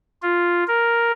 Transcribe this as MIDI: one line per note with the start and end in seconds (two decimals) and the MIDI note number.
0.23 0.64 65
0.68 1.12 70